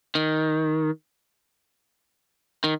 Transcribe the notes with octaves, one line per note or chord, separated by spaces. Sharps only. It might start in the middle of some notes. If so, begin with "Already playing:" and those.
D#3
D#3